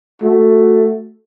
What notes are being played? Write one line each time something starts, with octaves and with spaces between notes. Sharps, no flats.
A3 F#4